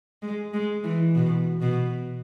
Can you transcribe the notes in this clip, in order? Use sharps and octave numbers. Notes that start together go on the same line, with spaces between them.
G#3
G#3
E3
B2
B2